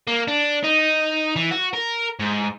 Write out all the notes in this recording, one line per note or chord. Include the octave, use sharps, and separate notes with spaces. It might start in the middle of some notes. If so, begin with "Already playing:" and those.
A#3
D4
D#4
E3
F#4
A#4
G#2